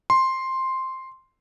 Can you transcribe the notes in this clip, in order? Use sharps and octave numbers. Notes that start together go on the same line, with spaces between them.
C6